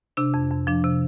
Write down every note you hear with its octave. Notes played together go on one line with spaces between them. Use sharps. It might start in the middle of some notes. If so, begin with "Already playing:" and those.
C3 D4
F2
F2
F3 D4
C3